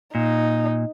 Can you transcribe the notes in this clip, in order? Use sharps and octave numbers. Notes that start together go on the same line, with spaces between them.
A#2 D#4